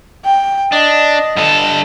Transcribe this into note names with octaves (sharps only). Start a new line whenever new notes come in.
G5
D4 D#5
G2 A4